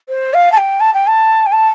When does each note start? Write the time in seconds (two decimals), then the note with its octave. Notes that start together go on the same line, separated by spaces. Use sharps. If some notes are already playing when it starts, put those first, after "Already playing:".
0.09 C5
0.34 F5
0.52 A5
0.57 G5
0.80 A5
0.94 G5
1.07 A5
1.46 G5
1.52 A5